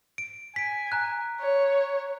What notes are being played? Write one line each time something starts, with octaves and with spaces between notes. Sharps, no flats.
D7
G#5 B6 D7
A#5 F#6
C#5